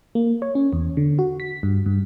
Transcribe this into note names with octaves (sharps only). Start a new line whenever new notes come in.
A#3
C#5
C#4
E2
D3
F#4
B6
G2
G2